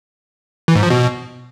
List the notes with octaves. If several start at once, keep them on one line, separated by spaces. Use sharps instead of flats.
E3
G#2
F3
B2